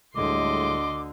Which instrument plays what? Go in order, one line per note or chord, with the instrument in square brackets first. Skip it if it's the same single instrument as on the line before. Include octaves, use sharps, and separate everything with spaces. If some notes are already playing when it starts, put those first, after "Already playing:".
[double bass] D2 D3 [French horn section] A2 G3 G#3 [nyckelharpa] D#5 C6 [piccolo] D6